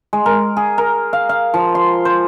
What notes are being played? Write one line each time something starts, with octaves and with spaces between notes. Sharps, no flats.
G#3
A#4
G#4
A#4
F5
F5
F3
C6
C5